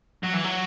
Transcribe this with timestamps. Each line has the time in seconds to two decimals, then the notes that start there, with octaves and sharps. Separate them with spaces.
0.23 F#3
0.34 E3
0.45 F#3